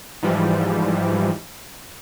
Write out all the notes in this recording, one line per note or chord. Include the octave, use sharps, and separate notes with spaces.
G#2 E3 F3 G3